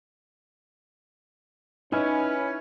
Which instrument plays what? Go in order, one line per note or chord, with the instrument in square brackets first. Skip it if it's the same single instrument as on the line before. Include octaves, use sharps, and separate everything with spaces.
[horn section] C#4 [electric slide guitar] D#4 D#5 G#5 [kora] E4 [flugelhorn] B4